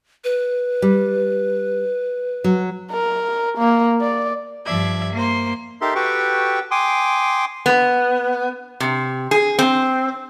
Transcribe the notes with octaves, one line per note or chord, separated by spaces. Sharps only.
B4
G3
F#3
A#4
A#3
D5
G2 F3 D5 E5 G#6
A#3 C5 C6
D#4 G4 A4 A#4 E5 C6
F#4 G4 A4 B4 G5 C#6
G5 G#5 C6 D6 D#6
B3
C3
G#4
C4